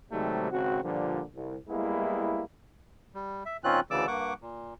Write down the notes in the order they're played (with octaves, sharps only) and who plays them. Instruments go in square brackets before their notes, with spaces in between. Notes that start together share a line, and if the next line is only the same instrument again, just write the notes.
[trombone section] G#2 C3 D#3 F#3 G3 A3
G#1 C#3 C4 F#4
G2 A#2 D3 F3
C2
G3 G#3 A#3 B3 E4
[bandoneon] G3
E5
A#2 D#3 C4 C#4 F4 F#6
D2 C#3 E3 D5 D6 E6
G2 A#3 F#5 C#6 D6
A#2